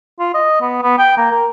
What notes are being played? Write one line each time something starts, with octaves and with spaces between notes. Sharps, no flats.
F4
D#5
B3
B3
G5
A#3
A#4